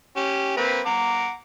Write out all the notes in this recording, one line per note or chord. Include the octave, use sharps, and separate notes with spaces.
C#4 G4
A#3 C4 B4
F#5 A#5 D6